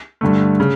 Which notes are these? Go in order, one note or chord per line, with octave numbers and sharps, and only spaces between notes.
G2 D3 A3
C#3